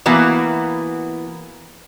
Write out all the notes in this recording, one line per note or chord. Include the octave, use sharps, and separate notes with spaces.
E3 A#3 B3 F#4